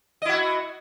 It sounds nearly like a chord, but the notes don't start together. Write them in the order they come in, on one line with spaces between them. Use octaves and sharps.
D#5 E4 F#4